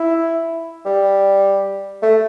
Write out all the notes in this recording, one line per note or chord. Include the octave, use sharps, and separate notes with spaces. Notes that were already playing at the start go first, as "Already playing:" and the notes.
Already playing: E4
G3
A3